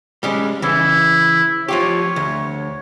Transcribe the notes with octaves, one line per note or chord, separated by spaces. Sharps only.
G3 G#3 C#4
C#3 E3 E4
F3 F4 G4 C#5
D2